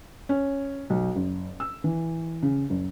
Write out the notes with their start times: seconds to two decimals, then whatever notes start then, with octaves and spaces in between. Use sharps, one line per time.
0.29 C#4
0.90 B1
1.15 F#1
1.60 E6
1.84 E3
2.42 C#3
2.70 F#1